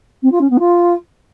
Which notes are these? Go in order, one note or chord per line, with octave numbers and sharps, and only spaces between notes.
C4
F4
C#4
B3
F4